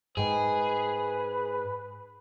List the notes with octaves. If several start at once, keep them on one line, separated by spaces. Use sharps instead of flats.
G#2 G#4 B4 G5